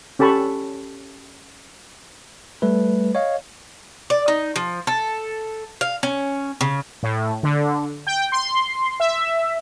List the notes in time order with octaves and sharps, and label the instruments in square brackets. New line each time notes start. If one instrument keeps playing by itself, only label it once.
[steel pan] C#4 G4 A4 A5 B5 C#6
[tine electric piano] G3 A3 B4
C#5 D#5 F5
[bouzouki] D5
D#4
F3
A4
F5
C#4
C#3
[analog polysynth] A2
D3
G5
C6
E5